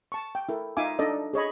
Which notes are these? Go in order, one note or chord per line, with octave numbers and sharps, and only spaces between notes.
A5 C#6
G5
E4 A4 A#4
D#4 F4 E5 F5 G#5 D6
D4 D#4 A4 D5 D#5
G#4 C#5 D#5 B5